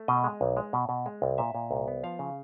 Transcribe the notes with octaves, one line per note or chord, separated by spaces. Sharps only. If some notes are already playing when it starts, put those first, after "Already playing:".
Already playing: A3
B2 D#5
G#3
B1
G#3
B2
B2
G#3
C2
A#2 E5
A#2
C2
B3
F3 F5
C#3